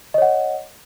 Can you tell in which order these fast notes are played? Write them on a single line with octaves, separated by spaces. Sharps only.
D#5 C#5 F#5